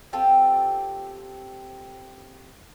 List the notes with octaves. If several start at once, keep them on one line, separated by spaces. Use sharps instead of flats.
C4 F4 G4 A4